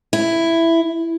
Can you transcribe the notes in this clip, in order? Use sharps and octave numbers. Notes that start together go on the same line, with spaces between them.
E4